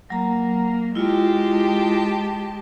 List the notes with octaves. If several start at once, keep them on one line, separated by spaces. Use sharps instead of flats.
F#3 A#3 A#5
G#3 E4 F4 G4 A5